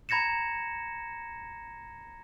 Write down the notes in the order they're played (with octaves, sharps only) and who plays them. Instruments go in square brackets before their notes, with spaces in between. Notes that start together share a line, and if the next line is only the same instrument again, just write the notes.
[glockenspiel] A#5 B5 G#6 A#6 C#7 E7